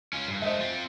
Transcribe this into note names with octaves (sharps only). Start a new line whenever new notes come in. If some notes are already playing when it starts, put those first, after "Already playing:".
C#4 F4
G2
G#3 A3 C5 D#5 E5
C4 F4